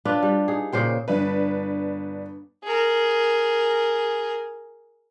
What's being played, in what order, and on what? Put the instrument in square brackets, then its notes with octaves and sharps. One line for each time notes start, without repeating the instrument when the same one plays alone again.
[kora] D4 F4 B4
G3
D#4 G#4
A#2 C#3 C5 G5
[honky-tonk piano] G1 D4 B4
[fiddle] G#4 A#4